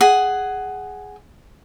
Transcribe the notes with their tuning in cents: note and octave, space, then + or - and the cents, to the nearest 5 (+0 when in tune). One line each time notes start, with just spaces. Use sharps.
G#4 +0 F#5 +10